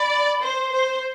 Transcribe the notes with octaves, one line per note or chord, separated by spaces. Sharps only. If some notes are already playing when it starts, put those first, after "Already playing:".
Already playing: D5 B5
C5 C6
C5